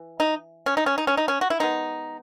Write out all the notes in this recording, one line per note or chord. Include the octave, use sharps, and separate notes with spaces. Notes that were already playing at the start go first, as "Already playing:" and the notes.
Already playing: E3
D#4
C#4
D#4
C#4
D#4
C#4
D#4
C#4
F#4
E4
D#3 G#3 B3 D#4